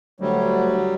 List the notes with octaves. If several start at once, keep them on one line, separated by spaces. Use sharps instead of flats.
D2 F#3 G3